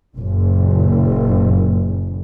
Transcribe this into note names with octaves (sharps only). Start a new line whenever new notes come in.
F#1 A#2